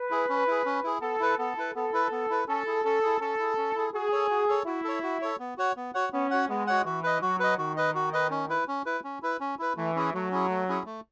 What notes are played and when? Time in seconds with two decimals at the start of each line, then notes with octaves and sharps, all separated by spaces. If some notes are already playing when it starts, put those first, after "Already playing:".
Already playing: B4
0.11 E4 G#4
0.29 C#4
0.47 E4 G#4
0.65 C#4
0.84 E4 G#4
1.01 B3 A4
1.20 E4 B4
1.38 B3 A4
1.57 E4 B4
1.75 B3 A4
1.93 E4 B4
2.12 B3
2.30 E4 B4
2.48 C#4 A4
2.66 E4 G#4
2.84 C#4 A4
3.02 E4 G#4
3.21 C#4 A4
3.39 E4 G#4
3.57 C#4
3.75 E4 G#4
3.94 F#4 G#4
4.12 A4 C#5
4.30 F#4
4.48 A4 C#5
4.66 E4 F#4
4.84 A4 C#5
5.03 F#4
5.22 A4 C#5
5.39 B3
5.57 F#4 C#5 F#5
5.76 B3
5.94 F#4 C#5 F#5
6.12 B3 C#4
6.31 F#4 C#5 F#5
6.49 G#3 B3
6.67 F#4 C#5 F#5
6.85 E3 F#4
7.03 B4 D#5
7.21 F#3 F#4
7.40 B4 D#5
7.58 D#3 F#4
7.77 B4 D#5
7.95 F#4
8.13 B4 D#5
8.31 C#4
8.49 E4 B4
8.68 C#4
8.86 E4 B4
9.04 C#4
9.22 E4 B4
9.40 C#4
9.59 E4 B4
9.77 E3 A3
9.96 C#4 E4 G#4
10.13 F#3 A3
10.31 C#4 E4 G#4
10.49 A3
10.68 C#4 E4 G#4
10.86 A3